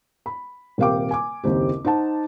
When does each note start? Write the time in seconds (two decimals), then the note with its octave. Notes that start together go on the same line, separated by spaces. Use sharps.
0.26 B5
0.78 D#1 C3 A#4 F5 G5 D6
1.11 G#5 D6
1.44 F#1 D#2 C4 G4
1.85 D#4 C5 F#5 A5